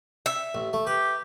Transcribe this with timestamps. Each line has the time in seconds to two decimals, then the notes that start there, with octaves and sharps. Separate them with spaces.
0.26 E5
0.55 A1
0.73 A3
0.87 G4 B4